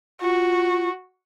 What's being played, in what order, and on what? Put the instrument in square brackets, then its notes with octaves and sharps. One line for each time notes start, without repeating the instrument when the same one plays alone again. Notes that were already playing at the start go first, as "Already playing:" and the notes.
[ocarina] F4 [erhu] F#4